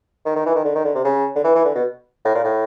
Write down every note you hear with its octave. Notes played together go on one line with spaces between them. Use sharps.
D#3
D#3
E3
D#3
D3
D#3
D3
C3
C#3
D3
E3
E3
D3
B2
A2
A#2
A2